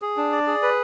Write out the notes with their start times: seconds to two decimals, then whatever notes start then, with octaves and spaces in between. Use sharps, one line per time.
0.02 G#4
0.17 D4
0.32 D5
0.47 G#4
0.63 B4